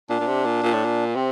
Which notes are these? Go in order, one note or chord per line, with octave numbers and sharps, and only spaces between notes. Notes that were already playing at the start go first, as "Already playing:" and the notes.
A#2 D4
A#2
C3
A#2
A#2
A2
A#2
C3 C4